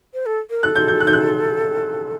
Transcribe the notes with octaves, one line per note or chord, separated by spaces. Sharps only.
C5
A4
A#4
A4 F#6
G6
G6
F#6
G6
F#6